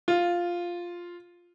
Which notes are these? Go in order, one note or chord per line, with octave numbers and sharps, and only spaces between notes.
F4